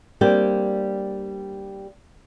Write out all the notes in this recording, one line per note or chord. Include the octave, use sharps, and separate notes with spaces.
G3 A#3 C4 D4 G4